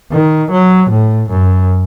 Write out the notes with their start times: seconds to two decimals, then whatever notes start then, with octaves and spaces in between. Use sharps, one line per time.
0.12 D#3
0.51 F#3
0.90 A2
1.30 F#2